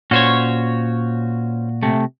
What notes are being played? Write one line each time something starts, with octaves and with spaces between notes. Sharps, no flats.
A#2 C#4 F#4 C5 C#5
C3 A3